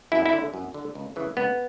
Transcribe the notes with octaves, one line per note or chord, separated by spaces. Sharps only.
F#2 E4
E4
D3
F#2
D3
C#2
C#3 E3
C#2 B3